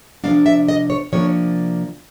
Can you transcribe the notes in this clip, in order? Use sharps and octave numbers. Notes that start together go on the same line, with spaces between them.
C3 F3 A#3 D4 F5
E5
D#5
C#5
C3 F3 A#3 D4 C#5